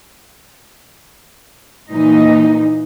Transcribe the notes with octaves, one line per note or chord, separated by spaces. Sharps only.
A#2 E3 D#4